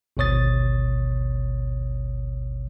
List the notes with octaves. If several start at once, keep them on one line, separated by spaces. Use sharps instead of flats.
G#1 D2 B2 C#5 D#6 A6